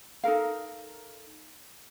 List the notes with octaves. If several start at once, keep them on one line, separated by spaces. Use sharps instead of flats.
D#4 A4 A#4 F5